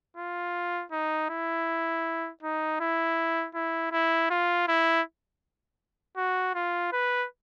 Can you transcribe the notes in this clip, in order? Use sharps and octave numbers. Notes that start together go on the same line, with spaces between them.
F4
D#4
E4
D#4
E4
E4
E4
F4
E4
F#4
F4
B4